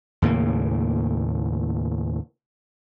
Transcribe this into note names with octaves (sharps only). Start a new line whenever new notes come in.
D#2 A2 C#3 A#3